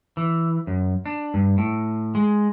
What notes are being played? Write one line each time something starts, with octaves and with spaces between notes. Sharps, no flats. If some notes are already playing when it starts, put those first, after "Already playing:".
E3
F#2
D4
G2
A2
G#3